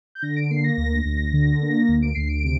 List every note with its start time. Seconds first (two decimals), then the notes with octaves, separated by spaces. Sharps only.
0.15 G6
0.22 D3 A#6
0.36 D7
0.50 A#3 C7
0.64 A#6
0.77 D2
1.05 D2
1.33 D3
1.61 A#3
1.88 D2
2.02 D7
2.15 D2 C7
2.29 D7
2.44 C3